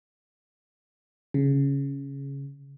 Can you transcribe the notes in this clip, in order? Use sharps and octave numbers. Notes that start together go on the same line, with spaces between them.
C#3